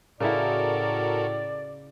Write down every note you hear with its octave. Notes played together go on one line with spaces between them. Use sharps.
A2 C#3 E4 F#4 A4 A#4 D5